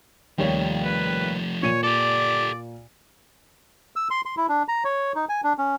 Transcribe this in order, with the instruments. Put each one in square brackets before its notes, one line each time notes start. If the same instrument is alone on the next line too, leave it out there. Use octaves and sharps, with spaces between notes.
[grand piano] D#2 G3 C#5 [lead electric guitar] F3 A3
[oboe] B4
[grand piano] A#2 D#7 [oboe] C#5
[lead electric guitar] G4 A4 [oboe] D5
[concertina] E6
C6
C6
E4
D4
A#5
C#5
D#4
G#5
D4
C#4